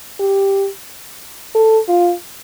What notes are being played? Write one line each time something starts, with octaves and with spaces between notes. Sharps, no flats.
G4
A4
F4